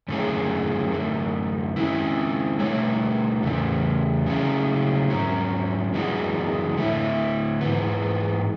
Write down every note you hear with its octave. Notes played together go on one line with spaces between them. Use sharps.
F#2 D3 A3 C#4 G#4
F#2 D3 A3
G#3 C#4 E4
B2 A3 D4 A4 C#5
E2 C#3 A3
C#3 F#3 A3 C#4 G#4
G#2 F#3 C#4
F#2 E3 G#3 D4 F#4
D3 A3 E4
G#2 E3 B3